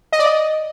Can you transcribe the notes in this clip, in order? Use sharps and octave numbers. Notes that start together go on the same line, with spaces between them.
D#5
D5
D#5